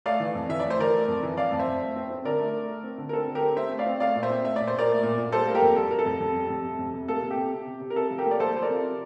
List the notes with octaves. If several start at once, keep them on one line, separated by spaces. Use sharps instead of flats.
A3 D5 F5
E3
F2
E3 E5
A3 D5
C5
E3 A#4 D5
A3
F2
E3
F2 D5 F5
F2
C5 E5
F2
A3
C4
C4
D3 A#4 D5
A3
A3
A3
C4
D3
A#4
C4 A4
D3
G4 A#4
C4
C4 C5 E5
A3
D5 F5
C4
A3 D5 F5
A#2
C5 E5
C4
A3 E5
A#2 D5
C5
A#2 A#4 D5
A3
A#2
A#2
G3 A4 C5
A#3
G4 A#4
F2
G3 A4
C3 A#4
A4
F2
F2
G3
F2
C3
F2
C3
A#3 A4
C3
G4
C3
C3
C3
C3
A#4
C3 A4
F3
G4 A#4
A#3
D5
F3 A4 C5
F3 C5
A#4 D5
C3